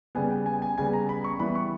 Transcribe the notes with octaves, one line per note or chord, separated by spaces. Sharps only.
C#3 G3 B3 G#5
G5
G#5
G#5
C#3 G3 B3 G#5
A#5
B5
C#6
E3 G3 B3 B5
C#6